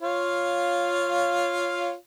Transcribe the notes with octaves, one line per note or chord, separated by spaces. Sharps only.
F4 C#5 F5